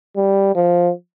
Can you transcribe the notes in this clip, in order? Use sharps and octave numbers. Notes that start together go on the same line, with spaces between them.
G3
F3